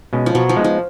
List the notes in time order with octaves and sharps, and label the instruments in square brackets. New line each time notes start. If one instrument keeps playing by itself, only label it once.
[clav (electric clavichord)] B2 G#3 C#4
[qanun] F3
[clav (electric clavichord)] B2 [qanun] F#3
[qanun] F3
[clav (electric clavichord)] G#3 B3 D#4
[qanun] F3